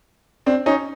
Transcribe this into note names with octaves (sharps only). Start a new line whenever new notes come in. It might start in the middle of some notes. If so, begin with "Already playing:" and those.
C4 D4
C#4 D#4